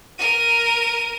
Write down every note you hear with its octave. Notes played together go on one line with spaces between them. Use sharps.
A#4 D#7